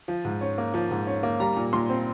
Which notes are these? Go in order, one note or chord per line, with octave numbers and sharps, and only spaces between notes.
F3
G#2
C#4
A#3
F3
G#2
C#4
A#3
G3 A#5
A#2
A#2 C6
C4